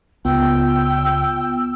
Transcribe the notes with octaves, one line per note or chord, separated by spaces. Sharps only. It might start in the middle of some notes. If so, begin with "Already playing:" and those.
C#2 B3 F4 G5 E6